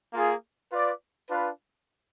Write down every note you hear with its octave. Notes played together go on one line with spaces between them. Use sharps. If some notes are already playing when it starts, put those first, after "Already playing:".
A#3 F4 G#4
F4 B4 D5
D4 F4 B4